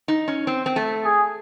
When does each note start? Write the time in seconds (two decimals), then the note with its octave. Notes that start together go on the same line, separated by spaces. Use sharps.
0.08 D#4
0.28 C#4
0.47 C4
0.66 C4
0.76 A3
1.05 G#4